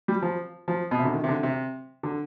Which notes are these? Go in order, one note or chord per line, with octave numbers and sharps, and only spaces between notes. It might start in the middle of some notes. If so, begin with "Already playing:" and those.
G3
F3
F3
B2
C3
D3
D#3
C3
D3
C3
D3